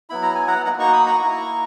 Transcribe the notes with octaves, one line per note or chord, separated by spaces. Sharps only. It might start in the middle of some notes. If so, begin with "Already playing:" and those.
F#3 B3 E4 B5
A#5
G#5
F#5 A#5
A#3 D#4 F#4 F#5 A#5
A#5 C#6
B5 D#6
A#5 C#6
A#3 E4